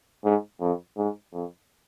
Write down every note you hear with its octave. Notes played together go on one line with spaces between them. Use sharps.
G#2
F2
G#2
F2